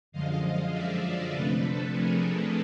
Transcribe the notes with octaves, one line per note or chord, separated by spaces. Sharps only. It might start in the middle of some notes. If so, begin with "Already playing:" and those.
F#2 D3 F3 G#3 D#5 F5
D5 E5
C3 F3 A3 D4 A4 B4
A4
G#4 A#4